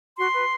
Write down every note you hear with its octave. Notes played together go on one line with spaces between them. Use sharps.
F#4 C6
B4